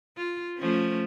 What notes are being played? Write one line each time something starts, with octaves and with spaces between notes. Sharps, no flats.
F4
F3 A3 C#4